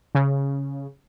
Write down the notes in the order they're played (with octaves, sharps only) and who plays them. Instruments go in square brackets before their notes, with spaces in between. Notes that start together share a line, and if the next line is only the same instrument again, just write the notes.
[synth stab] C#3